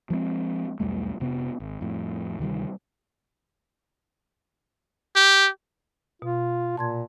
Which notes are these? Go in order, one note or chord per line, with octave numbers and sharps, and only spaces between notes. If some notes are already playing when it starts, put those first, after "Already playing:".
F3 G#3 A#3 C4
B1 E2 G3 A3
F1 C3 B3
G#1
F2 A2
D2 C3 D#3 G3
G4
B2 F4
A#2 A5 C6 G#6